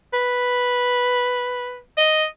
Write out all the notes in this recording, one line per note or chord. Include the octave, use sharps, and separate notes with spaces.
B4
D#5